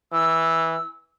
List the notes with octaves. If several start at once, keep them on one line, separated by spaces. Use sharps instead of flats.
E3 E6